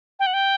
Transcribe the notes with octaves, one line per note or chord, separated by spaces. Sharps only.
G5
F#5
G5